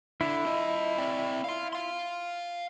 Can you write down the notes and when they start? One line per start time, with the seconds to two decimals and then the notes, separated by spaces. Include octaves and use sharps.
0.21 D3 D4 E4
0.46 F4 D#5
0.98 C4 D5
1.44 F5 C6
1.73 F5 C6